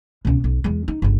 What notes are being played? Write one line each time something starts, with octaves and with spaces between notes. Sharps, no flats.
C#2 B2
B1
E2 G#3
D#4
G1 C#2